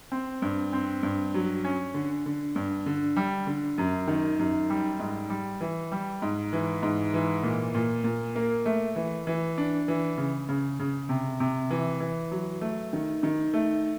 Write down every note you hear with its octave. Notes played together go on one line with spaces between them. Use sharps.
C4
G2
C4
G2
F#3
C#4
D3
D3
G2
D3
G3
D3
F#2
D#3
F#2
G3
G#2
G3
E3
G3
G#2
E3
G#2
E3
A#2
A#2
A#2
A#3
A3
E3
E3
D4
E3
C#3
C#3
C#3
C3
C3
E3
E3
F#3
A3
D#3
D#3
A3